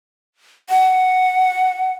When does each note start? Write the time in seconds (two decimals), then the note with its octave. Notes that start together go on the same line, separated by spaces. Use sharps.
0.70 F#5